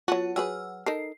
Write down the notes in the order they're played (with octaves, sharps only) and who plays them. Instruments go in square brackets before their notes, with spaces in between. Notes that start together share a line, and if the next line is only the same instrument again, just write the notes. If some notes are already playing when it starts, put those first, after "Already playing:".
[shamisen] F#3 B3 F#4 [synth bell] F4 A5
[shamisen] F#3 G#4 B4 [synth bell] F#5 E6 F6
[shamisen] D#4 A4 A#4 [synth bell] C7